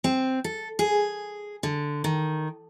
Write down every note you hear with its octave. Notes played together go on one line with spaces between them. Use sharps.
C4
A4
G#4
D3
D#3